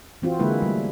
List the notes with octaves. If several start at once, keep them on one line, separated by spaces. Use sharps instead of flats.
E3 C4 F4 F#4
D3 G#3 A#3 E4 B4
G3 A3